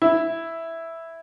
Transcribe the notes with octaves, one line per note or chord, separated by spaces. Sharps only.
E4